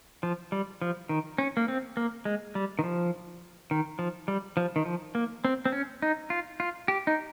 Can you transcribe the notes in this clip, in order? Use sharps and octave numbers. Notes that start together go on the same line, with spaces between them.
F3
G3
F3
D#3
C#4
A#3
C4
A#3
G#3
G3
D#3
F3
D#3
F3
G3
F3
D#3
F3
A#3
C4
C4
C#4
D#4
F4
F4
G4
D#4